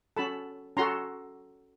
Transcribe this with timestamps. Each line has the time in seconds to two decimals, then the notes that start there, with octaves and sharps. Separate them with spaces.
0.17 C#4 F#4 A4 A5 B5
0.77 C#4 F#4 A4 A#5 C6